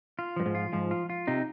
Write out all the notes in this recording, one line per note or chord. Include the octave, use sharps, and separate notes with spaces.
F4
G2 F3
G#2
F4
G#2 F3
F4
F4
C3 D#4